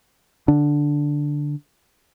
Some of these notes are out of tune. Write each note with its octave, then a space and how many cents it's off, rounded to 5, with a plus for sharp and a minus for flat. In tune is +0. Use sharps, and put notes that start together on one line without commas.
D3 +0 D4 +0